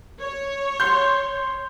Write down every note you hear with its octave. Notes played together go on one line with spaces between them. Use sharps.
C#5
C6 G6